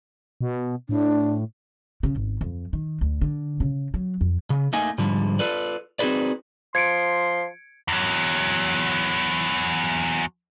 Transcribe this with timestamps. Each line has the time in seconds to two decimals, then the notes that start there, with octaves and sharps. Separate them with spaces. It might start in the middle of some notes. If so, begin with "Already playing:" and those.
0.41 B2
0.89 A2 D4
2.03 C#3
2.16 G#1
2.41 F2
2.73 D#3
3.01 D2
3.21 D3
3.60 C#3
3.94 F#3
4.21 F2
4.50 C#3
4.73 A3 A#3 D#4 D#5 G#5
4.98 G#2 D3 F3 G3
5.39 F4 A4 B4 D5
5.99 C4 D#4 F#4 G#4 B4 D5
6.75 F3 C6 G#6 C#7 D7
7.88 E2 F#3